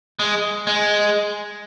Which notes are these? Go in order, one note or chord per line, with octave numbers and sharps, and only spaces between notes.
G#3
G#3